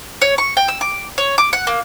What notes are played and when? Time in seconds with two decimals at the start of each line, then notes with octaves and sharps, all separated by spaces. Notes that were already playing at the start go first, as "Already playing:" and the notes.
0.22 C#5
0.38 C#6
0.57 G5
0.68 E6
0.81 D6
1.18 C#5
1.38 D6
1.53 F#5
1.67 A#3